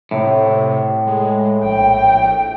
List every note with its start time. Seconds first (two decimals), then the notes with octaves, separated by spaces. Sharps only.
0.11 A2 C3
1.07 G#3
1.63 A#1 G5